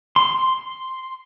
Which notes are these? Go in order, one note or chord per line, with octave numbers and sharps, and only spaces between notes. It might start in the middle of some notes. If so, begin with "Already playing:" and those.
C6